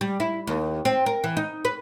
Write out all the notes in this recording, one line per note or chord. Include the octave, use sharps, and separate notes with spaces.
G3
E4
D#2
C4
A#4
E3
D#4
B4